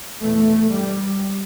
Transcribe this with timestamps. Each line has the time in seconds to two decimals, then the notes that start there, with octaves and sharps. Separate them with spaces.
0.22 E2 B2 A3
0.70 G2 G3